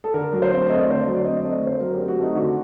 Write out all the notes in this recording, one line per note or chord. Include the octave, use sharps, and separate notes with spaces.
A4
D3 A#4
F#3
C5
C4
A3 D#5
D5
D3 C5
D5
F#3
D5
C4 D#5
A3 D#5
D5
D3 C5
F#3 A#4
G4
C4
F#4
A3 D#4
D3 F#4